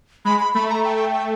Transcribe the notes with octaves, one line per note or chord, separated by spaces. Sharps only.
G#3 B5
B5
A3 B5
A#5
A3 G5
G5